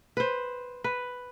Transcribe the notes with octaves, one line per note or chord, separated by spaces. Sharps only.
B4 C5
B4